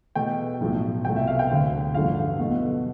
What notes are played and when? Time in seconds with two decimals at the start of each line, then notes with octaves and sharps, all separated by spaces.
0.15 E2 B2 A3 G5
0.60 B1 A2 F3 A3
1.05 C2 B2 A3 G5
1.16 E5
1.27 F5
1.39 G5
1.50 E1 D2 D3
1.94 A1 G2 D3 F3 A3 F5
2.39 B1 B2 A3